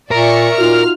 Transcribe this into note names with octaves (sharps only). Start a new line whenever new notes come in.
A#2 A#4 D5 E5 C#6
A#2 D#4 F4 F#4 F6